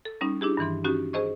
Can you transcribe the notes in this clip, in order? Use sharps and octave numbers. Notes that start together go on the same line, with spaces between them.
A4
G3 C#4 D#4
D4 E4 G4 G#4
G2 D#3 E3 C6
C#4 D#4 F#4 G4
G#4 C5 D#5 C#6